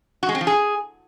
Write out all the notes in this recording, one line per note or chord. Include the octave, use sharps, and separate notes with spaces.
F#4
G#3
C4
F3
G#4